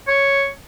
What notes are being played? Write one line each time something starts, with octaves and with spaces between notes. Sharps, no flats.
C#5